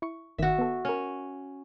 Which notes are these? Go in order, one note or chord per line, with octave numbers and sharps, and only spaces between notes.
E4 C#6
G1 D#3 F#4 E5
B3 A4
C#4 A#4 F6